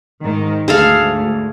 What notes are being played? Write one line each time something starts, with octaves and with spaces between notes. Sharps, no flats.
G#2 D#3
D2 G#2 G#4 A4 F5